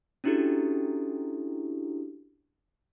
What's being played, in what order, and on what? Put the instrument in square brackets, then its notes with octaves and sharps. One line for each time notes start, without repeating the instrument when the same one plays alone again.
[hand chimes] C#4 D4 E4 F#4 G4 A4